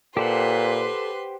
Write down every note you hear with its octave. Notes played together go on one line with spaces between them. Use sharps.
A#2 G4 A4 B4 C5 F#5 C6